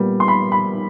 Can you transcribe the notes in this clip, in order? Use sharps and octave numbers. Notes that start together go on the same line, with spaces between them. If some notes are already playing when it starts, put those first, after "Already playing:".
Already playing: A#2 G3 B3
C6
B5
B5